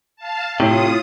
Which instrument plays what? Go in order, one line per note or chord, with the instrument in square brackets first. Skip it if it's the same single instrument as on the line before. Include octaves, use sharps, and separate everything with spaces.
[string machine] F5 A5
[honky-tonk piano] A2 [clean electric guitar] C3 [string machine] F4 D#6